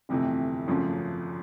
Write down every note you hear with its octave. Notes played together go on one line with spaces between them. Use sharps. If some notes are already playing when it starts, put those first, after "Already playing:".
G1 F2 C3 E3 A3
G#1 F#2 C#3 F3 A3